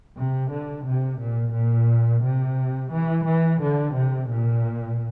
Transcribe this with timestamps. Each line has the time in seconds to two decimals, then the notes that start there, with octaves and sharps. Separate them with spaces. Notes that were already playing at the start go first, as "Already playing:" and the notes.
0.17 C3
0.52 D3
0.85 C3
1.20 A#2
1.54 A#2
2.23 C3
2.92 E3
3.25 E3
3.60 D3
3.94 C3
4.29 A#2